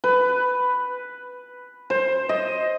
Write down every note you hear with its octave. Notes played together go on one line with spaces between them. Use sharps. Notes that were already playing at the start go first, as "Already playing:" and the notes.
B4
C5
D#5